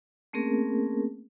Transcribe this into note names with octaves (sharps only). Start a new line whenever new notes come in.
A3 A#3 C4 C#4 G#4 A#4